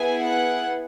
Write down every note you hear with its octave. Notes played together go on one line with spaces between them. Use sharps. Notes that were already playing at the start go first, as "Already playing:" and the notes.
Already playing: B3 E4 G#4 G#5
F#5